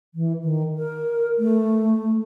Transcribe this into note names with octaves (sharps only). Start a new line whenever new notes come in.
E3
D#3
A#4
A3